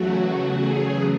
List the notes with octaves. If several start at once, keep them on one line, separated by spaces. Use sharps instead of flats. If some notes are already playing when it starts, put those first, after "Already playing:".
Already playing: E2 C#3 F#3 A3 F#4
G#4